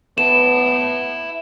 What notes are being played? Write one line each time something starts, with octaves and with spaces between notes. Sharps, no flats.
B3 E4 A5 E7